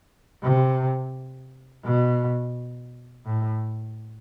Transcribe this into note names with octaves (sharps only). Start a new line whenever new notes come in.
C3
B2
A2